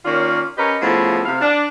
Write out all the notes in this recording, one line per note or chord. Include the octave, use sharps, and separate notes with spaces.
D#3 A#3 C#4 F4 C#5 D5
C#4 G4 A#4 B4 C#5 D#5
A2 C#3 F3 A3 B3
C3 F5
D4